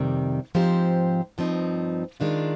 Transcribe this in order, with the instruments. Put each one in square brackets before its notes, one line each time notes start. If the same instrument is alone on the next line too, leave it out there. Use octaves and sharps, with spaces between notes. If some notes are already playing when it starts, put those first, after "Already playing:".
Already playing: [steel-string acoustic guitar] F2 C3 D#3 G3
G#2 F3 C4 G4 C5
G2 F3 C4 D#4
D#3 G#3 D4 F4